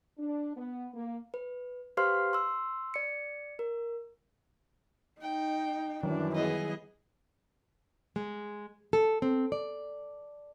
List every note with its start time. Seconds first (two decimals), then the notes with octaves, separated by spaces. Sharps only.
0.18 D4
0.56 B3
0.94 A#3
1.34 B4
1.97 G4 B4 C5 F5 C6 F6
2.33 C6 E6
2.94 D5 C#7
3.59 A#4
5.21 D#4 G5
6.03 F#2 D#3 E3 F#3 G3 D4
6.35 B3 E4 G#4 D#5
8.16 G#3
8.93 A4
9.22 C4
9.52 D5